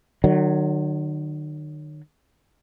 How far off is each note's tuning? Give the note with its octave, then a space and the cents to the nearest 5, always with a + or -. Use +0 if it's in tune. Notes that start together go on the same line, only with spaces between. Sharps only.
D#3 -45 F#3 +5